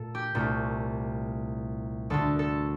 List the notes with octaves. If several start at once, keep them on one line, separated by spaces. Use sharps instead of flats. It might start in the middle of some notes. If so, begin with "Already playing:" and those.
Already playing: A#2 A3 A4
G4
C2 A#2 A3
D2 D3 A3 A4
A4